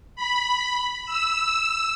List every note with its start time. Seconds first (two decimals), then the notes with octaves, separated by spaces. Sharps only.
0.16 B5
1.06 E6